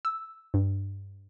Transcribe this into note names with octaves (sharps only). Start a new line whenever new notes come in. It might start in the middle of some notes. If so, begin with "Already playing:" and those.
E6
G2